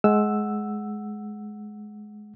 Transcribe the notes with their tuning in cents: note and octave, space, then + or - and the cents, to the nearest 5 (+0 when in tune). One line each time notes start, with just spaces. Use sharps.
G#3 +20 F#5 +0 E6 +0